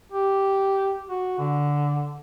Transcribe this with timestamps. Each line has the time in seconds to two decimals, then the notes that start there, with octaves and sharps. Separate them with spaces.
0.12 G4
1.09 F#4
1.39 D3